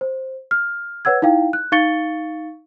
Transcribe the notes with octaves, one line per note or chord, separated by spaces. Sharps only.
C5
F6
B4 C#5 F#5 E6 G#6
D#4 E4 F5 G5
F#6
D#4 F5 C#6 A6 C#7 G7